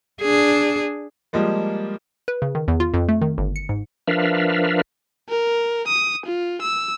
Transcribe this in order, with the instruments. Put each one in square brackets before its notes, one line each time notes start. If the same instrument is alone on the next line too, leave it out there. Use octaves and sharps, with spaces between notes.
[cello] D4 G#4
[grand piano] F3 G3 G#3 A#3
[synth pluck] B4
C#3
D#3
E2
F4
F2
A3
D#3
G1
C#7
G#2
[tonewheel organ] F3 D4 A#4 B4 E5 F5
[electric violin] A#4
D#6
F4
E6